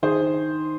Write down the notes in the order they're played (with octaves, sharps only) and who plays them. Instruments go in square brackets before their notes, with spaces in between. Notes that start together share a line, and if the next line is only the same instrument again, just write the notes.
[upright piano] D#3 G#4 C5